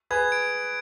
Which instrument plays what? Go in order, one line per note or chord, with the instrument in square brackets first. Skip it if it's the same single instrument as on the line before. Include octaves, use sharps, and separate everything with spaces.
[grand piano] G#4 B4 [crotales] G#6
[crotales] D7